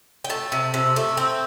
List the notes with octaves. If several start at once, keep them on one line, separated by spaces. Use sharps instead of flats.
G5
A3 A5
C3
C3
A3
C4